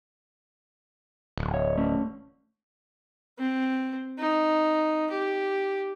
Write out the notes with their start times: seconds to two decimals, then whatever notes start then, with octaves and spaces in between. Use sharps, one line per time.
1.38 D1
1.54 C#5
1.77 A3 C#4
3.38 C4
4.18 D#4
5.10 G4